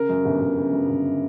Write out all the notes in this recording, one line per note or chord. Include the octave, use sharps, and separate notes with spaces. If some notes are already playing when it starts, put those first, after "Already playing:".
Already playing: C#3 A#4
F#2
G1
G1
C#3
F#2
G1